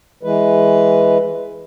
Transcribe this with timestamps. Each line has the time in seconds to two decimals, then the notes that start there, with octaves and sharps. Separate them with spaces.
0.23 E3 G#3 B4